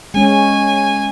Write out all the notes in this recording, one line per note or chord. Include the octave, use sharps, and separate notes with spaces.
G#3 C#4 G#5